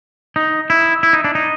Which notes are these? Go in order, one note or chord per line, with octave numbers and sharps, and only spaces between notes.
D#4
E4
E4
D#4
D4
D#4